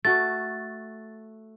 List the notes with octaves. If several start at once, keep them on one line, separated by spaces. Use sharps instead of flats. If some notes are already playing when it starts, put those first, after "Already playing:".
A3 F#4 A6